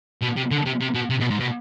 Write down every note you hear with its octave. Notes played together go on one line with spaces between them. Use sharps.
B2
C3
D3
C3
C3
B2
C3
B2
G#2
B2